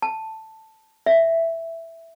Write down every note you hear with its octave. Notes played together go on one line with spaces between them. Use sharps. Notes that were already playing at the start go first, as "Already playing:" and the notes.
A5
E5